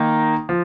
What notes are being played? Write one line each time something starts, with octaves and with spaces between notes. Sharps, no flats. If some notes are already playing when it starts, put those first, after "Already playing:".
Already playing: D#3 A#3 D#4
F3